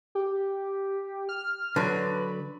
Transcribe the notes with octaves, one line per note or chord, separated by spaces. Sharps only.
G4
F6
D3 F#3 B4